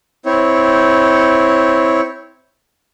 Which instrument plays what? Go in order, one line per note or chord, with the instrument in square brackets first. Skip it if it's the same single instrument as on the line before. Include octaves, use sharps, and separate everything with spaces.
[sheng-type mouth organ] C4 E4 C#5